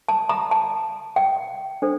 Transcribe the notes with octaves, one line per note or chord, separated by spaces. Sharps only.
A5
A#5
A5
G5
D4 A4 C5